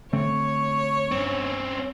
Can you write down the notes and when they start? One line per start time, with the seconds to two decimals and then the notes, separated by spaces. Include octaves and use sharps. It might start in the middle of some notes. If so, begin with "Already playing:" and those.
0.13 D3 A3 C4 C#5
1.12 G2 C4 C#4